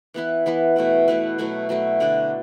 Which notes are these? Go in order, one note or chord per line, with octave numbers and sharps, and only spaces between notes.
E3 B3 E4 B4
E3 B3 E4 B4
B2 A3 E4 B4
B2 A3 E4 B4
B2 F#3 A3 E4
B2 F#3 A3 E4
D3 F#3 D4